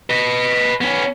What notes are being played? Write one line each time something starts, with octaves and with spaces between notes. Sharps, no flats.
B4 D#5
B3 C#4